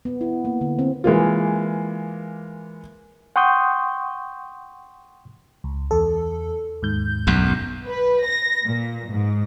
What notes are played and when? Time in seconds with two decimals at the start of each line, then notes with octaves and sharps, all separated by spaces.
0.05 B3
0.21 E4
0.45 A#3
0.61 D3
0.79 C4
1.04 E3 G#3 A#3 F4
3.36 F#5 G5 C6 C#6 D#6 G6
5.64 C#2
5.91 E2 A4
6.82 D#2 G#2 G6
7.27 B1 F#2
7.88 B4
8.25 A#6
8.66 A#2
9.12 G#2